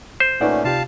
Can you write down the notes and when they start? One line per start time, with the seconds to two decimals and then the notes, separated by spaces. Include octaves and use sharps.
0.20 C5
0.41 A#2 A3 C#4 D#4 B4 D5 F#5
0.64 C3 F4 G4 F5 A5